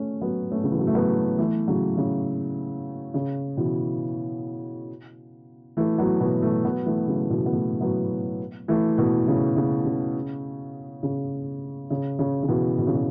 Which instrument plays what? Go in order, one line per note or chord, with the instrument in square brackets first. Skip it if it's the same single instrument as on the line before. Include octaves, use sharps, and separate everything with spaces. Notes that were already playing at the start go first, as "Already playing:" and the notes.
Already playing: [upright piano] A3 C#4
F#3 B3
A3 C#4
C#3
E3
F#3
A3
F#3 B3
E3 A3
C#3 F#3
C#3
C#3
B2 E3
E3 A3
F#3 B3
B2 E3
E3 A3
F#3 B3
E3 A3
C#3 F#3
B2 E3
B3
E3 A3
F#3 B3
E3 A3
B2 E3
C#3
C#3
C#3
C#3
C#3
C#3
C#3
B2 E3
B2
C#3
B2